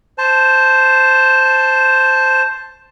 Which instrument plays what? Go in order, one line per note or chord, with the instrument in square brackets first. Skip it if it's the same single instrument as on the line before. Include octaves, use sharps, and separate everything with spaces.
[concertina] C5 A5